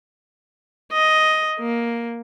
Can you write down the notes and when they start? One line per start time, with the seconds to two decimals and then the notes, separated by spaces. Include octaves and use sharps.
0.92 D#5
1.60 A#3